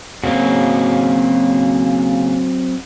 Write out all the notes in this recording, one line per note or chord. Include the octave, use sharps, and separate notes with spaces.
C#3 F#3 A#3 C4 F#4